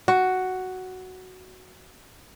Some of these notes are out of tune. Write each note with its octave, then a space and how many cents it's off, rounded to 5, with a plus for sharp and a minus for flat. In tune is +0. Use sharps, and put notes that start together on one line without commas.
F#4 +5